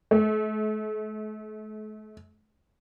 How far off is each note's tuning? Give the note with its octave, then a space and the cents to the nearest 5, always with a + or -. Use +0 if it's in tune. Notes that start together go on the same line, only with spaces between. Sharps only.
A3 -40